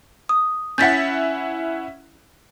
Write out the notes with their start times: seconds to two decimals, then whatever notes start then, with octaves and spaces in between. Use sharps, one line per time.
0.29 D#6
0.78 C#4 E4 F#5 G6 A6 B6